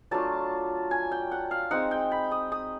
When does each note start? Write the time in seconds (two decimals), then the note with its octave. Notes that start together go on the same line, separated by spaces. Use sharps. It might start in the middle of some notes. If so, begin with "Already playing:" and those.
0.11 F#3 A3 D4 F4 A5
0.91 G#5
1.12 G5
1.31 F#5
1.51 F5
1.71 G#3 C4 D#4 F#5
1.91 G5
2.12 B5
2.31 D#6
2.52 D#6